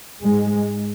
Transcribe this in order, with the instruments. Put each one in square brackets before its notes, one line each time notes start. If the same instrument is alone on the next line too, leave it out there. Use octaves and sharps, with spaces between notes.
[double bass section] G#2 G#3